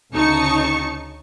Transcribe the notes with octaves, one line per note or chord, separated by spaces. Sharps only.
D2 C#3 D#4 A5 C#6 C#7